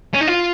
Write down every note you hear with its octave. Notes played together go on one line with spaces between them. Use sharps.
C#4
D#4
F4